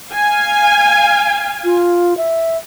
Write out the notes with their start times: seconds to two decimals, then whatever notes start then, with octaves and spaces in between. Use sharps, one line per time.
0.12 F5 G#5
1.64 F4
2.17 E5